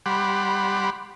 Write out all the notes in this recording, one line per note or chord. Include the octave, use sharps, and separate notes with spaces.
G3 F#5 B5 C6 D6